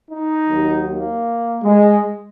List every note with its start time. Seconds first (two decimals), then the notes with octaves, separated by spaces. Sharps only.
0.10 D#4
0.48 D#2 D#3 F#3
0.87 A#3
1.63 G#3